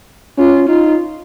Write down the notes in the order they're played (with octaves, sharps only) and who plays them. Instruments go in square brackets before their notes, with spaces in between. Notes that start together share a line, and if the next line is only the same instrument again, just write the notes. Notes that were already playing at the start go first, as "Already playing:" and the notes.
[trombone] C#4 [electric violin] F4
[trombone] D#4 [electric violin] F4